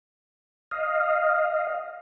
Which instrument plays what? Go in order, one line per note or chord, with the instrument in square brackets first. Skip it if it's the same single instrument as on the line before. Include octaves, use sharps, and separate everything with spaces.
[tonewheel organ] D#5 F5